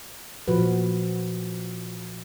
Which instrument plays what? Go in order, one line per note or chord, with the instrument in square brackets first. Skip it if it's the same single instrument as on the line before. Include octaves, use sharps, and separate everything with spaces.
[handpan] A#2 F3 F#4 B4